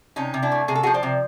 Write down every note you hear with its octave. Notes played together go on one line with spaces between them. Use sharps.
C3 C#4 D#4
C3
D4 E4
A3
C3 G#4
A4
F#4 G#4
F3
C5 D5
C3